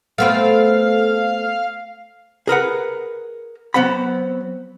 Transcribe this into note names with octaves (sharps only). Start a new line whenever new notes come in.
A3 B3 C4 F5
G#4 A#4 B4 F#5
F#3 B3 C4 F#5 B5